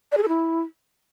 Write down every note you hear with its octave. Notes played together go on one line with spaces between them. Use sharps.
D5
G#4
A4
E4